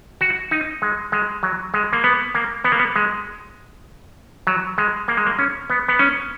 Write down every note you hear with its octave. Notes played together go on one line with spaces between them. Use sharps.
F#4
D#4
G#3
G#3
F#3
G#3
A#3
B3
A#3
B3
A#3
B3
G#3
F#3
G#3
A#3
G#3
A#3
C#4
B3
B3
C#4